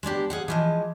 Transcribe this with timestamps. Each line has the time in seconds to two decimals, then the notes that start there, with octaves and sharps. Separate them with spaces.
0.03 G#3 B3 D4 G4
0.30 G#4 F5 F#5
0.48 E3 F3 G#3